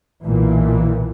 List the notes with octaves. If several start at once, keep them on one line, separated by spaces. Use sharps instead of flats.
B1 A#2 E3